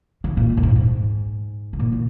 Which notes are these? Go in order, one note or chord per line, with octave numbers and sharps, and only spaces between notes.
C#3
A#2
G#2
F#2
G#2
G#2
C#3
A#2
C#3